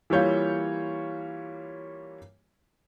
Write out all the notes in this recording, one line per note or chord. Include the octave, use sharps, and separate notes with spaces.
E3 G3 A#3 F4 C#5 G6